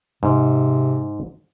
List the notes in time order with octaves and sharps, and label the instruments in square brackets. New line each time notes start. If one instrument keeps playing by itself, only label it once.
[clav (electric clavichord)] G#2 [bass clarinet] C3